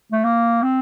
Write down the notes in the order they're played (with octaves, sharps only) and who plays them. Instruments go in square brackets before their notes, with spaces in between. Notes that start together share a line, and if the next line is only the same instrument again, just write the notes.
[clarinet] A3
A#3
C4